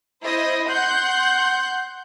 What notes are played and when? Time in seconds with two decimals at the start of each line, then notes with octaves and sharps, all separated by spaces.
0.23 E4 C5 D#5
0.67 F#5 C6 F#6 G6